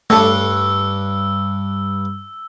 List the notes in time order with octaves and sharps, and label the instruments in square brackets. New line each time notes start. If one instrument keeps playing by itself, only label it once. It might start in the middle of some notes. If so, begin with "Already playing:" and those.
[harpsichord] G2 D4 C#5 [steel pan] A3 A4 [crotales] E6